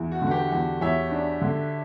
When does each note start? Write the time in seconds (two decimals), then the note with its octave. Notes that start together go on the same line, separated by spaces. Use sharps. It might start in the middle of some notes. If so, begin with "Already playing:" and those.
Already playing: E2
0.11 F#4
0.22 D3
0.27 F#4
0.31 G4
0.51 E2 F#4
0.81 E2 C#5 E5
1.11 D4
1.41 D3